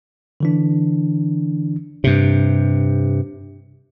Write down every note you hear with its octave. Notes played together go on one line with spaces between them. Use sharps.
D3 E3 D4
G2 C3